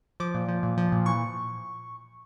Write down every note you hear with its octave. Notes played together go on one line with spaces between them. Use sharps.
F3 D6
A#2
F3
A#2
F3
A#2
E3 C#6